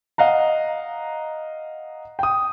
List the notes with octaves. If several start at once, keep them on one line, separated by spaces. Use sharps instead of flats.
D#5 F5 F#5 A#5
G5 D#6